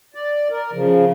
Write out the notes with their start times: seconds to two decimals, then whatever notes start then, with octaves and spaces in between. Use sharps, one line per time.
0.14 D5
0.50 A#4
0.73 C#3 F3